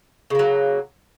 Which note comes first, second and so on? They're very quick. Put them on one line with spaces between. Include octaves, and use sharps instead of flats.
C#3 A#3 F#3